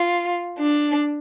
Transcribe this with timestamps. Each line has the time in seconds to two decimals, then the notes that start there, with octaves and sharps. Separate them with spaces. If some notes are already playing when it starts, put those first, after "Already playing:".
Already playing: F4
0.59 D4